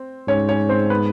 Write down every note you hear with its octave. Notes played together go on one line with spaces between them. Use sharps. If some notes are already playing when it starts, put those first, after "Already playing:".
Already playing: C4
G#2 C#4 C#5
C#4 C#5
C4 C5
B3 B4